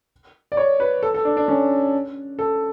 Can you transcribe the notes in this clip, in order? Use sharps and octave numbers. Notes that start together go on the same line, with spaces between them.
D5
C#5
B4
A4
A4
D4
D4
C#4
A4